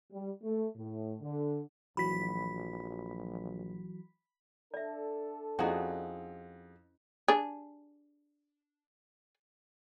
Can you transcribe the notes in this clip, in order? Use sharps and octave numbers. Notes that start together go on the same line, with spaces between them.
G3
A3
A2
D3
A#1 E3 F#3 F#4 B5 B6
D4 A4 D5 E5
F2 C#4 E4 F#4 G#4 D#5
D4 G#4